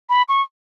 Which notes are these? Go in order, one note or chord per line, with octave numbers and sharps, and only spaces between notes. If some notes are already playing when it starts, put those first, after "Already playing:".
B5
C#6